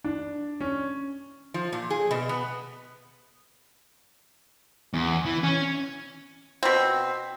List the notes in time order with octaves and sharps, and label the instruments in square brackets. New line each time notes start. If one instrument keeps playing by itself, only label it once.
[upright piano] D4
C#4
[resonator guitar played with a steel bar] F3
A#2
G#4
B2
B3
[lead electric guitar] E2
E3
C#4
[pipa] B2 C4